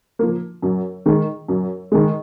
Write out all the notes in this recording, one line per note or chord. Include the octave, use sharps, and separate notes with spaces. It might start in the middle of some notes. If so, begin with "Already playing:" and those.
F3 A#3
F#2
D#3 G#3
F#2
D#3 G#3